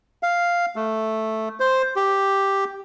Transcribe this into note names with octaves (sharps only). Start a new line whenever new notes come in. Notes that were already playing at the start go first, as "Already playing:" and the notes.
F5
A3
C5
G4